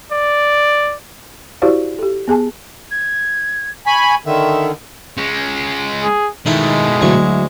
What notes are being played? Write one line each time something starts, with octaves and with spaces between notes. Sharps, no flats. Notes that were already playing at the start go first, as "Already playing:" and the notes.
D5
E4 F#4 G4 C5 D5 F5
G4 A4
B3 G#4 G#5 A5
G#6
G#5 B5 C#6
D3 D#3 E5
G#3 C#4
G#4
B2 D#3 G#3 A3 D#4 E4
D2 F#3 E4 C#6